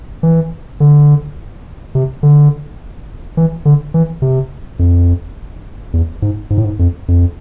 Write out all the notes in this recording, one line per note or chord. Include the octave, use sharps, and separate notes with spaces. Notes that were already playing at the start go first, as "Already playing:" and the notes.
E3
D3
C3
D3
E3
D3
E3
C3
F2
E2
G#2
G#2
A2
G#2
F2
F2